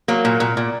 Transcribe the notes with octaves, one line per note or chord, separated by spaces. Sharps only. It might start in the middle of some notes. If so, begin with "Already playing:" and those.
F#3 A#3
A#2
A#2
A#2